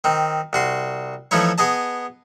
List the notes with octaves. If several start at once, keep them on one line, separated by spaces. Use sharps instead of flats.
D#3 C4
C2 F#4 C6
E3 F3 A3 D#4 E4 C#5
B3 G#4 D#5 A5